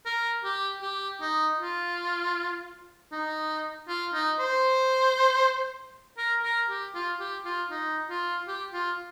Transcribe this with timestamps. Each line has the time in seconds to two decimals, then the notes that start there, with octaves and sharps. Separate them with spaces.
0.06 A#4
0.44 G4
0.82 G4
1.21 D#4
1.59 F4
3.12 D#4
3.88 F4
4.14 D#4
4.39 C5
6.18 A#4
6.43 A#4
6.69 G4
6.94 F4
7.20 G4
7.45 F4
7.71 D#4
8.09 F4
8.48 G4
8.73 F4